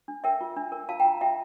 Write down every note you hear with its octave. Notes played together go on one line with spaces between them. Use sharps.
D4
A#4 E5 G5
F4
D4
A#4
F4 F5 A5
G5 A#5
F4
F4 E5 G5